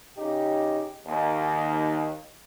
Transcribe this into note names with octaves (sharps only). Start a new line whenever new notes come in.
C#3 D#4 G4
D#2